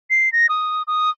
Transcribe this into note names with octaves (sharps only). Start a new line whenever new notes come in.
C7
A#6
D#6
D#6